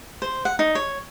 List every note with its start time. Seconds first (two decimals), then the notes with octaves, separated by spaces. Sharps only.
0.22 C5
0.45 F#5
0.59 D#4
0.75 C#5